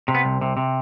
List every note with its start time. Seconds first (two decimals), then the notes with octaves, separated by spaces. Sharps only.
0.08 C3
0.15 B3
0.25 C2
0.41 C3
0.57 C3